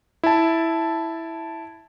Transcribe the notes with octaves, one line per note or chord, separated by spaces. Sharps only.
E4 A5